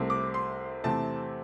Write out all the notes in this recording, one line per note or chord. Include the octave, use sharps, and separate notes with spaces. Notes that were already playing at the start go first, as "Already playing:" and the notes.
Already playing: C2 C3 A3 C4
D6
C6
E2 C3 A3 C4 A5